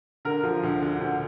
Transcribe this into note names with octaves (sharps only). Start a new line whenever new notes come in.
D3 A#4
F3
D2
D3
D2